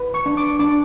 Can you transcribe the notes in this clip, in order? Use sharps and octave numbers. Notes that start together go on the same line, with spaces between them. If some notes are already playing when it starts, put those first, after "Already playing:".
Already playing: B4
C#6
D4
D6
D4 D6